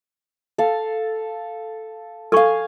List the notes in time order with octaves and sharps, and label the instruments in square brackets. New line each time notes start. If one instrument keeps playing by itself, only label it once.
[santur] A4 F5
[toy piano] A4 C#6 [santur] F5 G#5